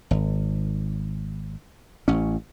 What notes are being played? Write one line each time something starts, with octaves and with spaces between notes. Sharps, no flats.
G#1
A1 C#4